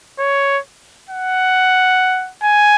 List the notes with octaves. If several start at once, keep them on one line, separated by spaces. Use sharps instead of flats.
C#5
F#5
G#5